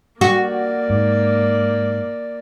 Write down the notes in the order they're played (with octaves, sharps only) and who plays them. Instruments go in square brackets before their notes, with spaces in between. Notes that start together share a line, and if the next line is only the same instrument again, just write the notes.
[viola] A#3 D5 [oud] F#4
[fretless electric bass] G#2